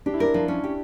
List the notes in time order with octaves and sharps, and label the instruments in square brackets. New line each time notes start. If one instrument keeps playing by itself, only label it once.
[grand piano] D4 [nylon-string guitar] G4
[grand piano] E4
[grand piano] D4 [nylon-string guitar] A#4
[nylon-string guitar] F3 [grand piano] D4
[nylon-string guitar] C#4
G4